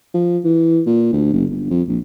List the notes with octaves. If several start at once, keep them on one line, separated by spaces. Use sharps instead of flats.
F3
E3
A#2
D2
F#1
G1
F2
A#1